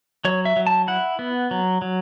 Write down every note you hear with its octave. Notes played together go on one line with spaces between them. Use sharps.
F#3 C#5
E5
F#3
A5
E4 F#5
B3
F#3
F#3